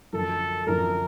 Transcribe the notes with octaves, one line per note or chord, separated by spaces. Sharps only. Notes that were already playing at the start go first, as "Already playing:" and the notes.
F#2 D3 F3 A4
F#2 D3 F3 A#4